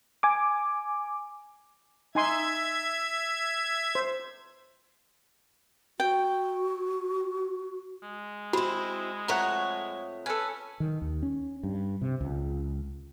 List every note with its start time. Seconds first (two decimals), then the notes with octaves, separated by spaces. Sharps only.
0.23 G#5 D6
2.15 D#4 E5 G#5 C6 G#6
3.95 C5
6.00 F#4 G5
8.03 G#3
8.53 C4 E4 F#4 B5
9.28 F2 A3 C#5 F#5 A#5
10.26 C#4 A4 B4 G#5
10.80 D#3
11.02 D#2
11.23 C#4
11.63 G2
12.02 C3
12.21 C#2